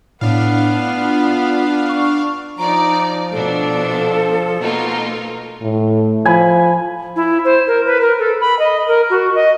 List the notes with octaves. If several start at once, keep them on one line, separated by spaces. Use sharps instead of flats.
A2 B3 D4 F5
F4
C#6
F3 D#4 D5 A#5 D6
B2 D4 A4
B2 A#3 D#4 F4
A2
F3 G#5 B5
E4
C5
A#4
B4
A#4
A4
B5
D#5
A#4
F#4
D#5